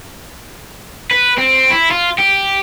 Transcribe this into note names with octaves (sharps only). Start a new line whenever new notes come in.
B4
C4
E4
F4
G4